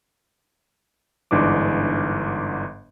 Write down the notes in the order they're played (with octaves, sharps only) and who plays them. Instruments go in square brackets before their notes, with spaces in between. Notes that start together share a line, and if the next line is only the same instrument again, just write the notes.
[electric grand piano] G1 G#2 E3 D4 D6